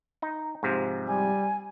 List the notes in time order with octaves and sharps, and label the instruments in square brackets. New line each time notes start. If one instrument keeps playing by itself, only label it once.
[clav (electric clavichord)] D#4
G#2 C3 F3
[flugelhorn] G3 [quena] G#5